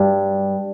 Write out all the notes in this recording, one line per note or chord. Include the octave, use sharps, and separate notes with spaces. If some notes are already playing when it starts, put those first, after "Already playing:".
Already playing: G2 G3 D5